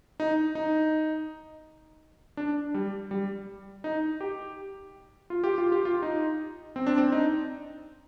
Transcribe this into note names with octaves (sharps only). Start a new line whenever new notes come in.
D#4
D#4
D4
G3
G3
D#4
G4
F4
G4
F4
G4
F4
D#4
C4
D4
C4
D#4